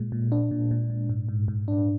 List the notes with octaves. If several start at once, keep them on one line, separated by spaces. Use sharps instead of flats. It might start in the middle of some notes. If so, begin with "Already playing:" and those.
Already playing: A#2 G#3
A#2
D4
A#2
A#2
A#2
G#2
G#2
G#2
D4